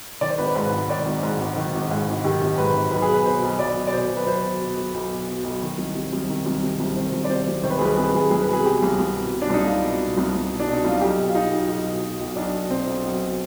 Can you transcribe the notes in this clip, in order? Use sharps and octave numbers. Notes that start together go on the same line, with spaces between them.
D#3 D5
C5
G#1 B4
C5
G#2 B4
G#1
D#3 D5
G#1
G#2
G#1
D#3
G#1
G#2
G#1
D#3 G4
G#1
G#2 B4
G#1
B1 B4
G#4
B2 B4
B2 C5
B1
B1 D5
B2
D5
B2 C5
B1
B4
B1 C5
B2
B2
B1
B1
B2
B2
B1
D#3
C2
C3
C2
D#3
C2
C3
C2
D#3 C5
C2
D5
C3 C5
C2
D#3 C5
B4
G#4
C2 B4
C3 G#4
B4
C2 G#4
C2 G#4
B4
B2 G#4
B2 G4
C2
C2
B2
B2
D4
C2 D#4
C2 F4
B2
B2
C2
C2
B2
D4
B2
D#4
C2 F4
B1 G4
B2
F4
B2 D#4
B1
B1
B2
B2
B1
B1 D4
B2
B2 C4
B1
B1
B2